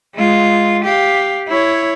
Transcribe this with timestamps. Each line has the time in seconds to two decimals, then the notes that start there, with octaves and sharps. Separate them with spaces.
0.15 G#3 F4
0.84 G4 F5
1.47 E4 C#5